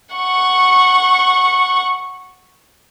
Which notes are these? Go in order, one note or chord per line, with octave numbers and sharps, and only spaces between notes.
F#5 C#6